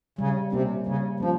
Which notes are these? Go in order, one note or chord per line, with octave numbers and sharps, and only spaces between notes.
C#3 G3
C3 A#3 C#4
C#3 G3
F3 A#3 C#4